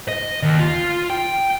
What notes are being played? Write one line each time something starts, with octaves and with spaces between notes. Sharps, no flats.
D#5
D#2
F4
G5